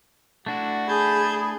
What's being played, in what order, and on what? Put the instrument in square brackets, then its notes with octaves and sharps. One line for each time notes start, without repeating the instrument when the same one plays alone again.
[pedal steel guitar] A3 D4 E4 [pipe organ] F#4
[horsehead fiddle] G#4 [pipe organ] A5 G6 G#6 [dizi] B5